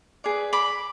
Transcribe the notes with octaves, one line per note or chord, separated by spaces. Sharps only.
G#4 B4 D5
B5 D6